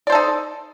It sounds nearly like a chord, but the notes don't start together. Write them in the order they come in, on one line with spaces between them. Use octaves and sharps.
D5 C5 A4 D#4